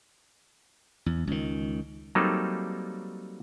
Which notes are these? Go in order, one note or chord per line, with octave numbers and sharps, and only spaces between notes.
E2
C#2 D#3
F#3 G3 A#3 C4 D#4 A4